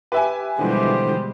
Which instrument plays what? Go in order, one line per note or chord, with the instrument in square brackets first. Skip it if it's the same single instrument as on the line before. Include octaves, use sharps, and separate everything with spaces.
[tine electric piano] G4 [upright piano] B4 E5 G#5
[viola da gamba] B2 G3 G#3 [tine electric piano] D3 E3 F3 [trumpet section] G4 C5